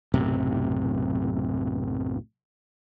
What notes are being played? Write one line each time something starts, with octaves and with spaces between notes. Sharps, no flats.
B1 F#2 A2 C3